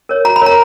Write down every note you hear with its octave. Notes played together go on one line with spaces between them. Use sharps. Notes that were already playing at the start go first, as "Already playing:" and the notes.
A#4 C#5
F#4 A#5
B5
A#4 C#5 A#5